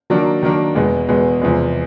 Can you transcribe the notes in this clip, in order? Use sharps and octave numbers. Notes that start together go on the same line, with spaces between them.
D#3 F#3 A#3 D4
D#3 F#3 A#3 D4
E2 B2 G#3 B3
E2 B2 G#3 B3
E2 C3 F3 G#3